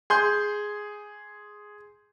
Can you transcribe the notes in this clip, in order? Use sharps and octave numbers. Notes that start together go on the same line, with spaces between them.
G#4 C6 G6